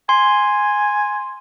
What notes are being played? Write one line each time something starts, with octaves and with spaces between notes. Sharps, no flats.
G#5 C6